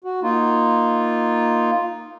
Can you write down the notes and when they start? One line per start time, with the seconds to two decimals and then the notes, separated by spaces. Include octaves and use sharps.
0.04 F#4
0.23 A#3 D#4 F4